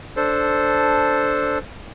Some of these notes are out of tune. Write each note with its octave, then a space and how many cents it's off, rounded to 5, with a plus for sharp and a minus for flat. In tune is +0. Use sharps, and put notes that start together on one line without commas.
D4 +0 A4 +0 C5 +0